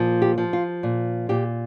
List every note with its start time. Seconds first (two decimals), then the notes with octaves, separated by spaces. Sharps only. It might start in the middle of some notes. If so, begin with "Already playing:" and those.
Already playing: A#2 F3
0.22 G4
0.38 F3
0.53 F4
0.83 A#2
1.29 A#2 G4